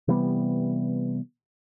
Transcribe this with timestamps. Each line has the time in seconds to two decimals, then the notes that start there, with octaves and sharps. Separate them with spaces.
0.08 C3 E3 G3 B3